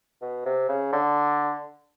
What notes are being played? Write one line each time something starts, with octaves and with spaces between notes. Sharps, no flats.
B2
C3
C#3
D3